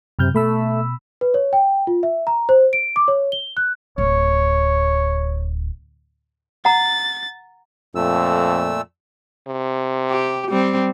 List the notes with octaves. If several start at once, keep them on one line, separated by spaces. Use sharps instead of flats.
F#2 C3 F6 G6
B2 A3 B5 E6
B4
C#5
G5
F4
E5
A#5
C5
D7
D6
C#5
G7
F#6
D1 C#5
F#5 A#5 A6
F2 A#2 A3 E6
C3
G4
G3 C4